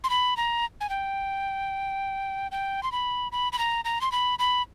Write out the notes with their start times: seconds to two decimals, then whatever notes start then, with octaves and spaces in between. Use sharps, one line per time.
0.04 C6
0.10 B5
0.37 A#5
0.81 G#5
0.89 G5
2.52 G5
2.83 C6
2.92 B5
3.32 B5
3.53 B5
3.59 A#5
3.85 A#5
4.01 C6
4.12 B5
4.39 B5